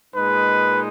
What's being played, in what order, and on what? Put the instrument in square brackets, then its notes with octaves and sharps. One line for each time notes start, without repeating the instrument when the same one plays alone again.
[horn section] A#2 G#3 D#4 B4